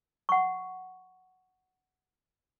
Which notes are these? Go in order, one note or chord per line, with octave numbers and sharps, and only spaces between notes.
F#5 C#6